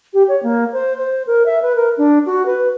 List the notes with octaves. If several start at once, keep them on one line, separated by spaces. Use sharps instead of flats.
G4
C#5
A#3
C5
C5
A#4
E5
B4
A#4
D4
F#4
B4